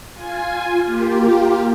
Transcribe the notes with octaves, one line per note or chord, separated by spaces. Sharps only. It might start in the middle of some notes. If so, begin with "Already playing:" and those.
F4 G#5
A#3 F4 G4